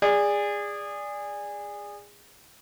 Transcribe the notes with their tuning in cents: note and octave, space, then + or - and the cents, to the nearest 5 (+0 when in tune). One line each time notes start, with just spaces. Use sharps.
G#4 -20 D5 +0